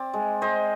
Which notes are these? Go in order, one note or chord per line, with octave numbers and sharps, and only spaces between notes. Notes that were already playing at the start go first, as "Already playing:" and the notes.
Already playing: C4 D5
G#3
G#3 C5 D#5